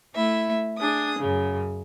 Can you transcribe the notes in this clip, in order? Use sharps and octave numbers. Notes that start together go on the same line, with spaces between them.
A3 E4 E5
D4 G#4 D#6
F#2 C#3